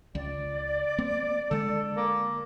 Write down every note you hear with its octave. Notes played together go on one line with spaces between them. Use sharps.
C#2 D5
A#3 C4
D3 G#3 A4
A#3